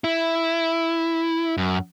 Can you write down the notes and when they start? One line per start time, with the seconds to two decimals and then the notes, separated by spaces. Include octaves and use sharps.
0.04 E4
1.57 F#2